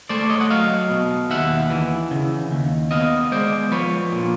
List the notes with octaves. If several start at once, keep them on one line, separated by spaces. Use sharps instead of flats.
A3 C5 D5
C#5 D#5
F#5
F#3 D#5 F5
B2
D#2 E5 F#5
E3
C#3
D#2
B3 D#5 F5
G#3 C5 D5
F3 B4 C#5
A#2